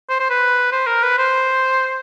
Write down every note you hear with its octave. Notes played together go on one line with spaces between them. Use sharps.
C5
C5
B4
C5
A#4
B4
C5